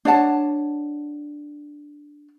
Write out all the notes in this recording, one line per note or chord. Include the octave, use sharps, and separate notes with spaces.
D4 C#5 F#5 A5